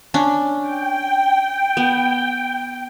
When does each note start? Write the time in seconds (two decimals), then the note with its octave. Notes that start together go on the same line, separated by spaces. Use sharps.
0.14 C#4 D4
0.61 G5
1.77 B3